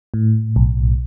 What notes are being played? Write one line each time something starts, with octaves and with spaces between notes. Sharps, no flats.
A2
B1